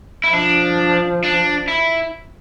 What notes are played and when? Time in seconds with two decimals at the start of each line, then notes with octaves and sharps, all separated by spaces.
0.24 E4
0.33 F3 D4
1.24 D4
1.68 E4